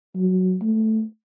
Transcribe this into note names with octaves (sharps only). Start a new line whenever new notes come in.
F#3
A3